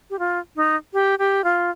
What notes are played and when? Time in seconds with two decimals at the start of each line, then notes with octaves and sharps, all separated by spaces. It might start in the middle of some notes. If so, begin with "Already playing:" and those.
0.10 G4
0.19 F4
0.56 D#4
0.93 G4
1.19 G4
1.44 F4